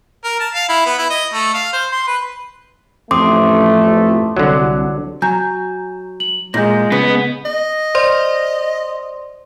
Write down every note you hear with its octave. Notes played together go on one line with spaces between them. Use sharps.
A#4
A5
F5
E4
B3
E4
D#5
A3
F5
C5
C6
B4
A1 F2 A3 C6 D6 D#6
C2 D3 F#3
F#3 G#5 A#5 G6
F#7
A#2 G#3 G6 A#6
C#3 B3 B4
D#5
C5 D5 C6